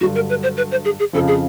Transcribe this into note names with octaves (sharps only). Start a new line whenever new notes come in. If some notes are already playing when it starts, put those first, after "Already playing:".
G2 D3 F#3 F#4
A#4
B4
C5
B4
C5
G#4
G#4
F2 C#3 F3 A4
G#4